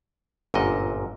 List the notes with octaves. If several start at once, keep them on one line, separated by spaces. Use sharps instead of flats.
G1 F#2 A#2 D#5